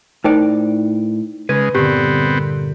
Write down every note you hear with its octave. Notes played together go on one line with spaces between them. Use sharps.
A2 D#4 A#4 C5 D5 G5
C#3 G#3 B4
G2 A#2 D3 B3 C4 G4